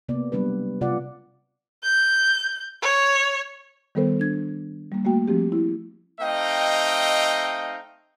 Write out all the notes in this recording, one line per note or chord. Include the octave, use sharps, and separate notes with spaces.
C3 A#3 B3 D5
F#3 G3 B3 D4 B4
C3 F4 D5 F#5
G6
C#5
D#3 G3 B3 A4 A#4 C5
D4 G#6
G3 A#3
A3 A#3 F#4 G5
F3 A3 C4 G4
E4
A3 C4 D#4 D#5 F5 G5